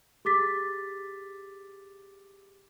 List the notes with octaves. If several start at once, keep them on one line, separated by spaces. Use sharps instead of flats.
G4 G#4 D6 A6 B6